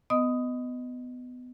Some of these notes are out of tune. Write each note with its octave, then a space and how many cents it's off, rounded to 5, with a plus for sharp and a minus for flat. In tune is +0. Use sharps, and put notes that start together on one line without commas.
B3 +20 D#5 +0 D#6 +5